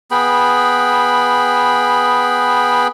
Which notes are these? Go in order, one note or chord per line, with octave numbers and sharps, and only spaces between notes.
B3 G#4 G5 B5